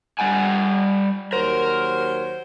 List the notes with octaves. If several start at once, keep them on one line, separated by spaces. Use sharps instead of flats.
G3 F#5 G#5
D#2 F#3 A#4 C5